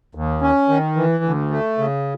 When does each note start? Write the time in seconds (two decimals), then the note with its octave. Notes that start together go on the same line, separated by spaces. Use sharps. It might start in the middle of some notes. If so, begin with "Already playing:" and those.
0.15 D#2
0.42 C#4
0.69 D#3
0.96 E3
1.24 D2
1.51 A3
1.78 C#3